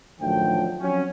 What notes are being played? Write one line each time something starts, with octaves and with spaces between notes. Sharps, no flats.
A1 D2 D#3 F3 F#3 G5
F3 F#3 C4 C#4